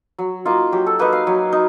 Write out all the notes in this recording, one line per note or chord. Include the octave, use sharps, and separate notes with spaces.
F#3
A#3 D#4 F4
F#3 G4
A4
A#3 D#4 B4
F5
F#3
D#4